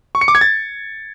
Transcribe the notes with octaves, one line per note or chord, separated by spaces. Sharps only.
C#6
C#7
D6
G#6
A6